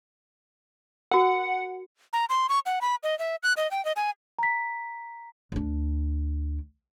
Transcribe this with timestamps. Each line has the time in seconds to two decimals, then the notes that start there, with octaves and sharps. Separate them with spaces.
1.11 F#4 A#4 F#5
2.13 A#5
2.29 C6
2.49 C#6
2.66 F#5
2.81 B5
3.03 D#5
3.19 E5
3.43 F#6
3.57 D#5
3.71 G5
3.85 D#5
3.96 G#5
4.39 A#5 B6
5.52 D2 D4